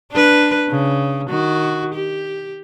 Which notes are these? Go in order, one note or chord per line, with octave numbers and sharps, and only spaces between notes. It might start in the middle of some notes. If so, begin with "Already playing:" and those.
D4 B4
C#3
D#3 F#4
G4